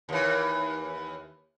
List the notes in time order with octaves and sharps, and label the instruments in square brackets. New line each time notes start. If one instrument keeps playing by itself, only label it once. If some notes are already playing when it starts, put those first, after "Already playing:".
[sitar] D#2 E3